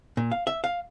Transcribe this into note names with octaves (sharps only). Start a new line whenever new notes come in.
A#2
F5
E5
F5